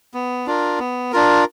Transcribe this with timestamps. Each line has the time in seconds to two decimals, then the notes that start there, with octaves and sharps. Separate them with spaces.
0.14 B3
0.46 D4 F4 A#4
0.79 B3
1.13 D4 F4 A#4